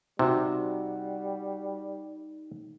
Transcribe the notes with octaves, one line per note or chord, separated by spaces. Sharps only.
C3 G3 D#4 F#4